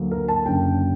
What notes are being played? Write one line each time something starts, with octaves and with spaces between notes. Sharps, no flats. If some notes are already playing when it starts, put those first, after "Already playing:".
Already playing: D2 D3 F#3 A#3
A#4
A5
F#1 F#2 D3 G5